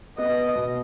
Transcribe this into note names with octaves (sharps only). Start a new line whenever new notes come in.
B3 D#5
B2